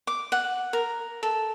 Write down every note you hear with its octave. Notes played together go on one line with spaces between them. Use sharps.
D6
F#5
A#4
A4